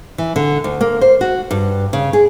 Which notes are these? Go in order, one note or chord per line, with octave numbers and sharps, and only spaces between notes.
E3
D3
D2
A#3
C5
F#4
G2
C#3
G#4